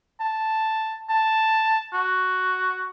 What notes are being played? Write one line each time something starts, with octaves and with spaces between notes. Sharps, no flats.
A5
A5
F#4